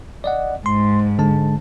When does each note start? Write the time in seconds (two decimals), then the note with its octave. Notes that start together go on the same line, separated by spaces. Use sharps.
0.24 D5 D#5 F#5
0.66 G#2 C6
1.19 D3 G#3 A5